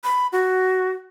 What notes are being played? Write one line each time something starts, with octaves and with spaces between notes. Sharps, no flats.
B5
F#4